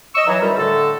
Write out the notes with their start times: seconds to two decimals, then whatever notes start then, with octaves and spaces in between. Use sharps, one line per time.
0.15 D#5 C#6 E6
0.27 E3 F#3
0.41 F#2 D#3 E3 G3
0.57 A2 D3 A4